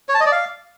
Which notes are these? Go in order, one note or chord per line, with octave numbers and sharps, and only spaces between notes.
C#5
A5
D#5
D5
F5